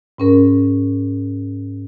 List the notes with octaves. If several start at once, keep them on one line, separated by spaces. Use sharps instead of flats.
G#2 C#4 A#4